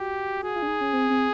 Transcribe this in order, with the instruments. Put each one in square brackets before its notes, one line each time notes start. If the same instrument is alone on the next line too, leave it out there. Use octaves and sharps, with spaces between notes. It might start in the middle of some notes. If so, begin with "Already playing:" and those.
Already playing: [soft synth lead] F#4 [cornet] G4
[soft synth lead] F#4 [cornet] G#4
[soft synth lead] F4
D4
D#4
C#4
C4
C4